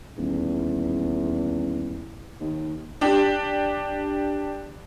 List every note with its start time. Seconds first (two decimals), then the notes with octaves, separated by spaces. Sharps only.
0.18 D#1 E2
2.40 D#2
3.01 D4 G4